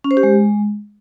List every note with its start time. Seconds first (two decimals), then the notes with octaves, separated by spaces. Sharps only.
0.04 C#4
0.11 C5
0.17 G4
0.23 G#3